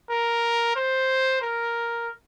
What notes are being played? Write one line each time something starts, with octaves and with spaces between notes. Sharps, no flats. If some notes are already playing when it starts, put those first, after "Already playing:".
A#4
C5
A#4